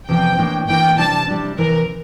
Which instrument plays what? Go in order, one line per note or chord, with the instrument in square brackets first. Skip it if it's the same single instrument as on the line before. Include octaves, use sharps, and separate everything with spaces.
[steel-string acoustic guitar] E2 C3 F3 C4 [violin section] G5
[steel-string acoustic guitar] A2 E3 A#3 D4
[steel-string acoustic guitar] A2 E3 A#3 D4 [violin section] G5
[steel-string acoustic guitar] C3 G3 D4 [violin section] A5
[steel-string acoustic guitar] C3 G3 D4
[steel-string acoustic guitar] E2 C3 E3 [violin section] A#4